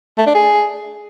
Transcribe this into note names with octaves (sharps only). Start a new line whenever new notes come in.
A3
D4
G#4